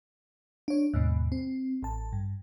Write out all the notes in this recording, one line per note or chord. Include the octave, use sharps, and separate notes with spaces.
D4 C#5
D#2 G#2 B2
C4
A1 A5
G2